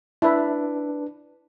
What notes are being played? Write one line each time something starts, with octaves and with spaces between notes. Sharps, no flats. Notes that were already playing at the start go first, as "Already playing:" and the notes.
D4 E4 B4